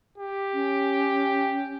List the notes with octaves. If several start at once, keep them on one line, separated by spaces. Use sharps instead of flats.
G4
C#4